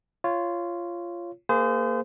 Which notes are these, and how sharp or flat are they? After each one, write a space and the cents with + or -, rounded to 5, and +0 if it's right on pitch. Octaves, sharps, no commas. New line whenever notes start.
F4 -15 C#5 +0
A#3 -10 G#4 +0 C5 -35